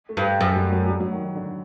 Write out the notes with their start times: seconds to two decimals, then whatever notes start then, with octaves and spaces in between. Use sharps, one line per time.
0.09 A3
0.17 G2
0.41 F#2
0.56 G3
0.72 F#3
0.88 G3
1.00 F#3
1.12 D#3
1.24 D#3
1.35 D3